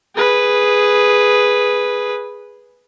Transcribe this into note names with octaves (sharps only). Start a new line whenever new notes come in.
G#4 B4